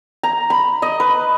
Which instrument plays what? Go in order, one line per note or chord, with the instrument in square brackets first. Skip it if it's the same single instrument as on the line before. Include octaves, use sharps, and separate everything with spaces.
[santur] A#5
B5
D#5
B4